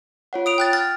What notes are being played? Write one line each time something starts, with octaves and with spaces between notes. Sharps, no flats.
F4 C#5 F#5
D#6 D7 F7
G5 F#6 A6
F6 A6